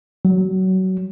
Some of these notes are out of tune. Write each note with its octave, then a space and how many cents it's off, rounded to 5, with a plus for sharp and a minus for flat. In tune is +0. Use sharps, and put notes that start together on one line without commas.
F#3 +20